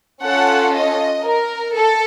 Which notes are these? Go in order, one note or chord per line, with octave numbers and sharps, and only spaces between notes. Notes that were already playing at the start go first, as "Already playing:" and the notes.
C#4 F4 A4 F#5
D#5
A#4
A4